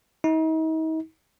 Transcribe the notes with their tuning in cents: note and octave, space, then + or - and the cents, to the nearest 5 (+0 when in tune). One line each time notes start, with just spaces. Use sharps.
D#4 +40